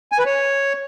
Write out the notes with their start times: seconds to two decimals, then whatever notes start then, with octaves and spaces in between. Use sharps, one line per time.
0.12 G#5
0.19 B4
0.26 C#5